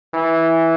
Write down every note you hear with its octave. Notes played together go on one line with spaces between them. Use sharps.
E3